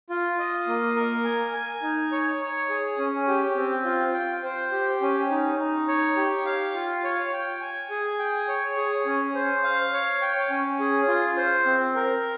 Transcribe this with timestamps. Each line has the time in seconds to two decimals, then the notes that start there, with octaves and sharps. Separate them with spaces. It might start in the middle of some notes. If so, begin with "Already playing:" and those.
0.10 F4
0.39 D#5
0.67 A#3
0.96 A#4
1.24 G#5
1.54 G#5
1.82 D#4
2.12 C#5
2.41 C#5
2.70 G#4
2.98 C#4
3.28 G4
3.56 C4
3.85 F4
4.14 G5
4.44 C5
4.72 G4
5.02 C#4
5.30 D#4
5.59 D#4
5.88 C#5
6.17 G4
6.46 F5
6.74 F4
7.04 C#5
7.33 G5
7.61 G#5
7.90 G#4
8.19 G5
8.48 C#5
8.77 G#4
9.06 C#4
9.35 C5
9.63 F5
9.93 C#5
10.22 G5
10.50 C#4
10.80 G#4
11.08 F4
11.37 C5
11.66 C4
11.95 A#4